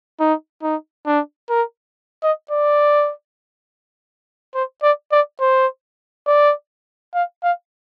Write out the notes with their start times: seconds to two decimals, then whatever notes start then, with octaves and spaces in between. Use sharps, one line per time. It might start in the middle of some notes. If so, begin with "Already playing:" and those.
0.20 D#4
0.63 D#4
1.06 D4
1.49 A#4
2.23 D#5
2.51 D5
4.54 C5
4.83 D5
5.12 D5
5.41 C5
6.27 D5
7.14 F5
7.43 F5